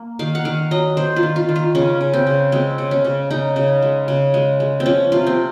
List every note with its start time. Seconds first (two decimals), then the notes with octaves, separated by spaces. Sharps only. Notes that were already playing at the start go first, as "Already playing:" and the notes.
Already playing: A#3
0.19 D#3 F5
0.35 F#5
0.45 D#3 F5
0.71 F#3 D#5
0.97 D#3 C5
1.16 F4
1.23 D#3
1.36 F4
1.49 D#3
1.56 F4
1.75 C#3 C#4
2.01 C#3
2.14 C4
2.27 C#3
2.52 G#3 C4
2.78 C#3
2.91 C#4
3.05 C#3
3.30 C#3 D#4
3.56 C#3
3.82 G#3
4.08 C#3
4.34 G#3
4.60 G#3
4.80 C4
4.86 F3 C#4
5.12 C3 F4
5.27 C4